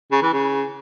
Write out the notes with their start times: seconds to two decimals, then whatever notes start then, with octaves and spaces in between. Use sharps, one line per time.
0.12 C#3
0.22 E3
0.33 C#3